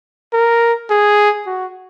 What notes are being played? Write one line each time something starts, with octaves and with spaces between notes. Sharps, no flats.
A#4
G#4
F#4